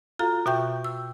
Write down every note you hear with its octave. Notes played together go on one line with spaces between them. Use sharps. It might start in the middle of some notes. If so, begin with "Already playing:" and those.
F4 F#4 A4 F5 A#5
B2 F#4 E5 G5 C#6 G6
E6